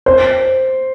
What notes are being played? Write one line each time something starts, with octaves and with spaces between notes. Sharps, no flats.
C5